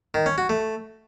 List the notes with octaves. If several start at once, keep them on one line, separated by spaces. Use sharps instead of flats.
D#3
C#4
F#4
A3